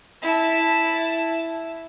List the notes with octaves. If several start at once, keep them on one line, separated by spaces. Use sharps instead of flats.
E4 A5